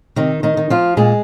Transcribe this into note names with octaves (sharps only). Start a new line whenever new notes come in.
C3 D#3 D#4
D#3 D#4
D#3
F3 F4
A#2 G#3 G#4